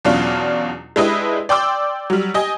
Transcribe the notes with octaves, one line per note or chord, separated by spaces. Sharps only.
E2 B2 F#3 C#4 D4 F4
G#3 D4 E4 G4 B4 D#5
D5 G5 C6 D6 E6
F#3 G3
G4 D#5 G#5